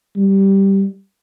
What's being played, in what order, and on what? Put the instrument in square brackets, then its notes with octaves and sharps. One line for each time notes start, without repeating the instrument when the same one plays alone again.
[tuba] G3